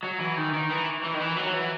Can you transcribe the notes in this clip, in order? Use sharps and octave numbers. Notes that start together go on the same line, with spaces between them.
F#3
E3
D#3
D#3
E3
E3
D#3
E3
F#3
E3